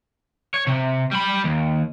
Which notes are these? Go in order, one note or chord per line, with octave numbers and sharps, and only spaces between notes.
C#5
C3
G3 B5
D#2